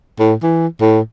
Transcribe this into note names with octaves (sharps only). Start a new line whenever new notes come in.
A2
E3
A2